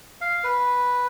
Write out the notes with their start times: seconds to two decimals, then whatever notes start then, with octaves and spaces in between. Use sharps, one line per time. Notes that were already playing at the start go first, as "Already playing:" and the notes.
0.21 F5
0.44 B4